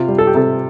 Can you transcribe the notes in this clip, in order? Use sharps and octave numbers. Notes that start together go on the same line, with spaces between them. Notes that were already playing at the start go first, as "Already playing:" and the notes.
Already playing: C3 F4
G3
A4
G4
C3 A4